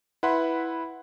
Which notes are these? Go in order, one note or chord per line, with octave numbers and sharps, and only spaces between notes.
E4 B4 F#5 B5 C6